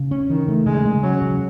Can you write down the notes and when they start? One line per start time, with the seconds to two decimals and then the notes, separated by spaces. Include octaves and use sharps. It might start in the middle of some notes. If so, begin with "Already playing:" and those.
Already playing: C#3
0.11 C#4
0.30 D#3 E3
0.48 A3
0.66 C#3 G#3
0.86 G#3
1.03 F#3 C#4
1.21 C#3